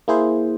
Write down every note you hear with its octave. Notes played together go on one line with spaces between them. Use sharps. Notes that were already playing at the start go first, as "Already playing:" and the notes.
A#3 E4 G#4 C5